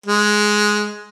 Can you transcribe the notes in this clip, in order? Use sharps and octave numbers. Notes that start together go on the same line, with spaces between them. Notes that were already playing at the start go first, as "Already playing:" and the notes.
G#3